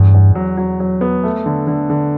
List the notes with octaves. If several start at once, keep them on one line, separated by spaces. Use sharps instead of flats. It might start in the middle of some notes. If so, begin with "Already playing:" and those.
Already playing: E2 G2
E2
F#3
F#3
F#3
B3
A3
D3
D3
D3